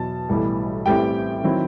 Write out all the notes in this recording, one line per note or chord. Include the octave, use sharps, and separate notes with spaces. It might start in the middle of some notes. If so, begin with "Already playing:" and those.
Already playing: E2 B2 F#3 A5
B1 A2 E3 G3
A1 A2 E3 G3 C4 G4 G5
D#3 F#3 C4 E4